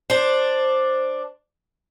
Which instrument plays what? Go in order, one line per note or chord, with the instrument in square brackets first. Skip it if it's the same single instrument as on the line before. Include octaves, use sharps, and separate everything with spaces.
[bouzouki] D4 C5